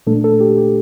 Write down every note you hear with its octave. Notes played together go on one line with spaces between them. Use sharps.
A#2 A3 D4 A4
A4
G4
G4